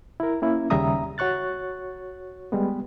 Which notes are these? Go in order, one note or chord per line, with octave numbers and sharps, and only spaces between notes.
E4 A#4
A#3 C#4 E4
D#2 C#3 G3 E5 A#5 D#6
F#4 C#5 C#6 F#6 A6
G3 G#3 B3